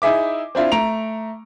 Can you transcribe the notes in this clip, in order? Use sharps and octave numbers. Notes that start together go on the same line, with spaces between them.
D#4 E4 G#4 E5 D6
C4 D4 E4 F4
A3 A#5 D7 F7